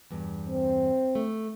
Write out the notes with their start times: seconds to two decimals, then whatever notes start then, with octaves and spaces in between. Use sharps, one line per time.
0.11 E2 G2
0.49 C4
1.15 A3